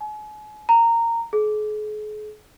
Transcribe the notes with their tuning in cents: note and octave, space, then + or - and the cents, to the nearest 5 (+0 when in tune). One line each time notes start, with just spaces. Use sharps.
G#5 +40
A#5 -15
G#4 +40